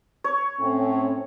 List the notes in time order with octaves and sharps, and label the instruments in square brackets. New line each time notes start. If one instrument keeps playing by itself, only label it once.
[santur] C#5
[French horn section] A2 C4 C#4